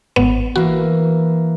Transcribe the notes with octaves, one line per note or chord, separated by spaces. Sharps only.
G#1 B3
E3 A#3 F#4